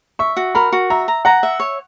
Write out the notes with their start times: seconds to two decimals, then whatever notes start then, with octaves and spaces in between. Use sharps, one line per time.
0.19 E5 C#6
0.37 F#4
0.55 A#4 B5
0.72 F#4
0.90 E5 A#5
1.08 A#5
1.25 F#5 A#5
1.43 E5
1.60 C#5